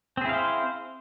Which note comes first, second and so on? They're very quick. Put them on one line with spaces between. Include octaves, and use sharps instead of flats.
C4 G#4 E4 F5 C5